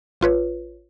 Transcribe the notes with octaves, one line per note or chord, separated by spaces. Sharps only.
A1 F4 B4 C#5